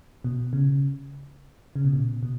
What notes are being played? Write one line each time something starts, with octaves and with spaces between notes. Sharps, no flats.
B2
C#3
C#3
B2
A#2
B2